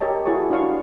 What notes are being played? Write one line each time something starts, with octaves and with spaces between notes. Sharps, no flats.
G4 A#4 C#5 D#5 A5
E4 F#4 G#4 C#5 A5 C#6
D4 F#4 C#5 F5 C#6